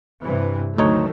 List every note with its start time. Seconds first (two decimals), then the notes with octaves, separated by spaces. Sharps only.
0.23 G2 C3 E3
0.78 D2 D#3 F#3 A3 D#4 C#5